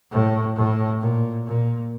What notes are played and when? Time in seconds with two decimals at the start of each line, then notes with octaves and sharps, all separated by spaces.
0.11 A2
0.56 A2
1.01 A#2
1.46 A#2